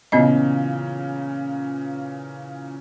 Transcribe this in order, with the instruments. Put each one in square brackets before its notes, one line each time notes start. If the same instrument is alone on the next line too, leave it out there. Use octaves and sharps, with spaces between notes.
[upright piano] A#2 C#3 E3 [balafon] B3 C#4 D#5